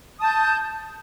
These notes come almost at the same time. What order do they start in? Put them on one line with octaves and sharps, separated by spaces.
D#6 A5 G6